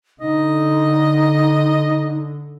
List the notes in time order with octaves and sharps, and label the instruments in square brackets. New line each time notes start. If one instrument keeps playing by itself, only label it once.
[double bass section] D3 [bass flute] D#4 [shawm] D#5